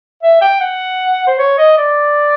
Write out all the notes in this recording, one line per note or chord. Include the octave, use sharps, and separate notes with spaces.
E5
G5
F#5
C5
C#5
D#5
D5